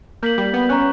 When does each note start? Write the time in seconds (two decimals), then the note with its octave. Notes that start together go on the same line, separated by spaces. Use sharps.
0.23 A#3 G6 B6 F#7
0.38 G3
0.53 B3
0.69 C#4 A#5 C#6 F#6